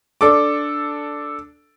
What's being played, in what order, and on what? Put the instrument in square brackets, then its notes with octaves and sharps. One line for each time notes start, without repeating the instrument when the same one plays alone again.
[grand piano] D4 A4 D6